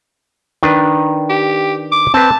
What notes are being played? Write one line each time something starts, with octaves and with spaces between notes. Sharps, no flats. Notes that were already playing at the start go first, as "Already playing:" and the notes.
D#3 D4 B4
G4
D6
C4 B4 A5